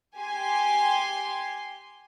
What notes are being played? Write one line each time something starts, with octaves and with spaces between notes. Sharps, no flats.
G4 G#5 C6